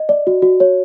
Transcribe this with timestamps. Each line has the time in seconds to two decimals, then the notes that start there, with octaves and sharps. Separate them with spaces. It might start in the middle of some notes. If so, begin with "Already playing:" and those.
Already playing: D#5
0.09 D5
0.27 F#4
0.42 F#4
0.60 C#5